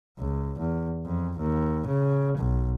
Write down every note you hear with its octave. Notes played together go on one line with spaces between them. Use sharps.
C#2
E2
F2
D#2
C#3
B1